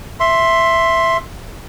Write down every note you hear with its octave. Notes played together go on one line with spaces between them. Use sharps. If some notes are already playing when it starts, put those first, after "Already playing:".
E5 C6